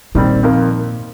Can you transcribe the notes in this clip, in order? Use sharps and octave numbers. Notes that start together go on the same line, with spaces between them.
A#2 D#3 G3 C4
F2 D#3 A#3